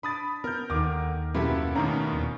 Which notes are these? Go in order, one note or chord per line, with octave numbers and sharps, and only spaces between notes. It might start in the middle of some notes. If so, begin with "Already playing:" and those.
D4 B5 D#6 A6
B3 A#4 F6 G6
D#2 D3 D#3 D6
F#2 B2 A#3 E4 F4 G4 A4
A2 D#3 C#4 D4 A#5
D#1